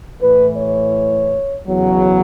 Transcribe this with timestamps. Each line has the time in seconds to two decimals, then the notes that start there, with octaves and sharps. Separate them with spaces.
0.20 A2 E3 B4
0.57 C#5
1.66 E2 C#3 F#3